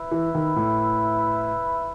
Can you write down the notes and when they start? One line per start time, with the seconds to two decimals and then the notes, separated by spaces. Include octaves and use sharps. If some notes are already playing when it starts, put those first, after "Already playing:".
Already playing: E4 B4 E5
0.11 E3
0.35 D#3
0.56 A2